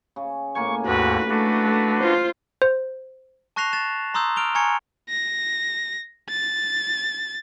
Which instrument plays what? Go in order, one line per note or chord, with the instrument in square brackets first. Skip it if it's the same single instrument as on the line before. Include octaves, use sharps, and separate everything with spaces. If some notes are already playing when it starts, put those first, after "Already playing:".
[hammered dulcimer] C#3
[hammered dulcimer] A2 A#3 G#5 [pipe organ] C#6
[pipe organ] D#2 G#2 [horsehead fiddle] F#4 B4
[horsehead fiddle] A3 [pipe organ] D4 F#4 B4
[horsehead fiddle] F4 C5
[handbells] C5
[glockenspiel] A5 C#6 F#6 A#6 C7 F7
A6 E7
A#5 C6 D#6 E6 G6
F6 D7 F7 G7
G#5 A#5 C#6 F6 G#6 C#7
[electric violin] A#6
A6